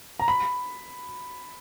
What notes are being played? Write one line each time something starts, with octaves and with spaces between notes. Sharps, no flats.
A#5
B5